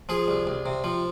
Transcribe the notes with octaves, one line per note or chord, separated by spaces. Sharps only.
F3 G#4
C2
C2
C3
F3